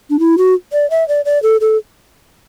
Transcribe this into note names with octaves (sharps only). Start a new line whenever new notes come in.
D4
E4
F#4
D5
E5
D5
D5
A4
A4